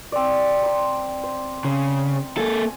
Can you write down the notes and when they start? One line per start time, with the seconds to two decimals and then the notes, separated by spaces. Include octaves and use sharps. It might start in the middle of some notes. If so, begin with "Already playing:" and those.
0.12 C4 D5
0.63 A#5 C6
1.23 C5
1.65 C#3
2.37 A#3 A4 G#5